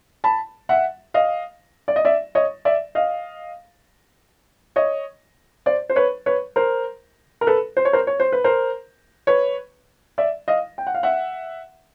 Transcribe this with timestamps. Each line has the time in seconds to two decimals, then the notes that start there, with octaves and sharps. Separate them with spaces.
0.24 A5 B5
0.69 E5 F#5
1.14 D#5 F5
1.88 D5
1.96 D#5
2.05 D5 E5
2.35 C#5 D#5
2.65 D5 E5
2.95 D#5 F5
4.76 C#5 D#5
5.66 C5 D5
5.90 C5
5.96 B4 C#5
6.26 B4 C#5
6.56 A#4 C5
7.41 A#4
7.47 A4 B4
7.77 C5
7.85 C#5
7.93 A#4 C5
8.07 C#5
8.20 C5
8.32 B4
8.44 A#4 C5
9.27 B4 C#5
10.18 D5 E5
10.48 D#5 F5
10.78 G5
10.87 F#5
10.94 F5
11.03 E5 F#5